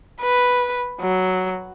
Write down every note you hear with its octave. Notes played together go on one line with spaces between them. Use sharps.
B4
F#3